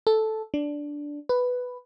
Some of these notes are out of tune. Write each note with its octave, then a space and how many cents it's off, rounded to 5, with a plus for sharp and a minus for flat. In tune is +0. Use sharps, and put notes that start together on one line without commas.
A4 -5
D4 -5
B4 +5